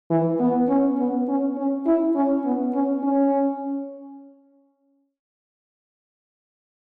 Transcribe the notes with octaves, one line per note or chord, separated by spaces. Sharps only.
E3
B3
C#4
B3
C#4
C#4
E4
C#4
B3
C#4
C#4